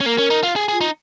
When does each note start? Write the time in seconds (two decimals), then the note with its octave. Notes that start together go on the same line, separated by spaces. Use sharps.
0.01 C#4
0.06 A#3 A#4
0.18 C#4
0.30 D#4
0.43 F4
0.56 G#4
0.68 G#4
0.72 F4
0.81 D#4